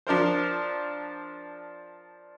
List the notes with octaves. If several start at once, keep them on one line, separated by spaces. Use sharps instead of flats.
F3 D4 A#4 C5